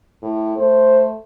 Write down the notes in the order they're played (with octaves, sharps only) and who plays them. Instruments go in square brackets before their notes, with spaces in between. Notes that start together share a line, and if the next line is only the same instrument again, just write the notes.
[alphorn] A2
[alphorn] A3 [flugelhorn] C5